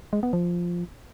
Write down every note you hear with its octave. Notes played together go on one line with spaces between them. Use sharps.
G#3
B3
F3